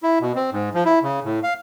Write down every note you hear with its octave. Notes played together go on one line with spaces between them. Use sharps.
E4
B2
C4
G#2
F3
E4
C#3
A2
F5